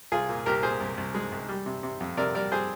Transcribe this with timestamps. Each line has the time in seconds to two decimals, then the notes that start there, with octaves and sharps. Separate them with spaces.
0.12 C2 F4 G#4
0.29 A#2
0.46 C2 G4 A#4
0.63 A#2 G#4 C5
0.80 C2
0.97 C2
1.14 G#3
1.32 C2
1.49 G3
1.66 C3
1.83 C3
2.01 F2
2.17 C3 A#4 D5
2.34 G3 A#4 D5
2.52 G3 G#4 C5